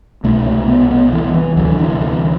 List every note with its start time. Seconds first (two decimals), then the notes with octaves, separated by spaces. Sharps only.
0.24 C2 B2 A3
0.46 A3
0.68 B3
0.91 B3
1.13 E3
1.34 E3
1.56 D2 C3 F#3
1.69 D3
1.79 E3
2.01 E3